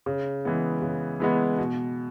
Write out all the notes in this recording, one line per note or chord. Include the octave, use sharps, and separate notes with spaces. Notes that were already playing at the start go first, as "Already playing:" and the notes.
C#3
E3 G#3 B3
C#3
E3 G#3 B3
B2